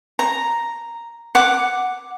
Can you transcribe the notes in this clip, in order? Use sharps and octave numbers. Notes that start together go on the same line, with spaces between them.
A#5
F#5 D6